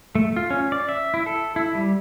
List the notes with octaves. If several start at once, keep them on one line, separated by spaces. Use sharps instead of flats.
A3
F4
C#4
D5
E5
E4
A4
E4
G3